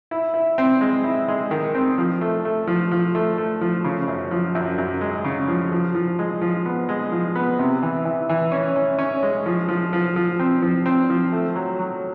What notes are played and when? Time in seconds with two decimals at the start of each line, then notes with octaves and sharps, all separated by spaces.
0.11 E4
0.34 E4
0.58 C4
0.81 G#3
1.04 E4
1.28 G#3
1.51 D#3
1.75 C4
1.98 F3
2.21 A3
2.45 A3
2.67 F3
2.92 F3
3.15 A3
3.38 A3
3.61 F3
3.84 C#3
4.08 F#2
4.31 F3
4.55 F#2
4.78 F#2
5.01 G#3
5.24 C#3
5.48 F3
5.72 F3
5.95 F3
6.19 G#3
6.41 F3
6.65 B3
6.89 G#3
7.12 F3
7.35 B3
7.59 C3
7.83 E3
8.05 E3
8.29 E3
8.52 C#4
8.76 C#4
8.98 C#4
9.23 G#3
9.46 F3
9.68 F3
9.93 F3
10.16 F3
10.39 C4
10.62 F3
10.86 C4
11.10 F3
11.32 A3
11.55 F#3
11.79 F#3